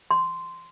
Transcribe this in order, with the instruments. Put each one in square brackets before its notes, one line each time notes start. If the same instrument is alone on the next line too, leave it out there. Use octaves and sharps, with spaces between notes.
[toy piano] C6